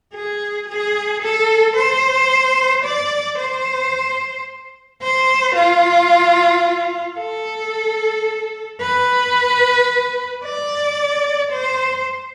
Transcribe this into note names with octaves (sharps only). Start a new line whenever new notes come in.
G#4
G#4
A4
C5
D5
C5
C5
F4
A4
B4
D5
C5